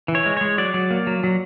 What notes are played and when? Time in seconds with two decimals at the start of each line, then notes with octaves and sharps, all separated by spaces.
0.08 E3
0.15 C#5
0.26 G#3
0.37 G#3 C#5
0.58 F#3 D5
0.74 F#3
0.91 A#3
1.07 F#3
1.23 F#3